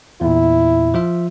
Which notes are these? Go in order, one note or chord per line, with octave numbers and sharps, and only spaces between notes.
E2 A#2 E4
F3 F4 E5